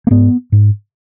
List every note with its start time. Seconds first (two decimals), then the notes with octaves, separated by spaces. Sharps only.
0.07 A#3
0.11 G#2 B3
0.52 G#2